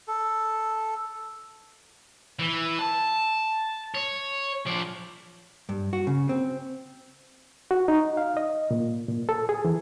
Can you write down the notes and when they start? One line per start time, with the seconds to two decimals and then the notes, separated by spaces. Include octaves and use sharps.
0.08 A4
2.39 E3
2.79 A5
3.95 C#5
4.66 F3 D5
5.69 G2
5.93 F#4
6.07 C#3
6.29 C4
7.71 F#4
7.88 D#4
8.17 F5
8.37 D#5
8.71 A#2
9.09 A#2
9.29 A4
9.49 G#4
9.65 E3